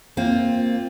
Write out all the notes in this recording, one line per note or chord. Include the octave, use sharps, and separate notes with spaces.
A#3 C4 F4